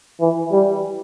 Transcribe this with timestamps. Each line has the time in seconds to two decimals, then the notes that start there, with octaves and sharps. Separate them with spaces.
0.20 E3
0.51 G3